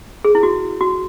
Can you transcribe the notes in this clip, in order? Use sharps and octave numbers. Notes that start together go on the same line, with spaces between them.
G#4
E4
F#4
F#4